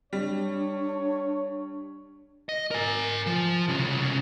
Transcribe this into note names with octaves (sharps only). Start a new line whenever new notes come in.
G3 D4 C#5
D#5
A#4 G#5
F3
C2 C#3